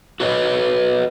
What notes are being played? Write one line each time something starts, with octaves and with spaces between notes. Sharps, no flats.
F#4 B4 C#5 D#5